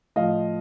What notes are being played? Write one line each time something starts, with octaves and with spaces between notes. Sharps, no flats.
A2 F3 D#5 F5